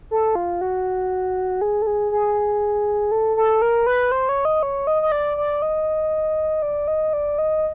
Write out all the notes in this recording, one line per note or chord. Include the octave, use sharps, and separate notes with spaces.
A4
F4
F#4
G#4
A4
G#4
G#4
A4
A4
A#4
B4
C5
C#5
D#5
C#5
D#5
D#5
D5
D5
D#5
D5
D#5
D5
D#5